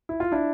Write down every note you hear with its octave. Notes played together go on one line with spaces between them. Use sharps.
E4
F4
D4 E4